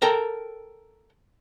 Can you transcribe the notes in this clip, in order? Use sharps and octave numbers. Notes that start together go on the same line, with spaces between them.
A4 A#4 G5 A#5